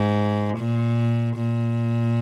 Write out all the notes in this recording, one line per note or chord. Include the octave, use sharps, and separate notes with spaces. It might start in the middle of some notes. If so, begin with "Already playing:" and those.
Already playing: G#2
A#2
A#2